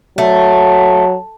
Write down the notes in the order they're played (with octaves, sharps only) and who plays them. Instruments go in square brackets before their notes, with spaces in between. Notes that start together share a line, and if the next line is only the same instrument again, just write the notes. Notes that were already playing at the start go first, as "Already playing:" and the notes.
[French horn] F#3 [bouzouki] A3